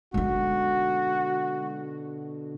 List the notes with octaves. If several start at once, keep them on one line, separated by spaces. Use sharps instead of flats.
B2 D3 G#3 D#4 F#4